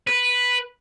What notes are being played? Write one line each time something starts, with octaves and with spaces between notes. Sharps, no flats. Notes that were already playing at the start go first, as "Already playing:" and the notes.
B4